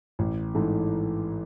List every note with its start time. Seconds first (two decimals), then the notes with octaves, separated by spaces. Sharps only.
0.19 A1
0.55 G#2 E3 A3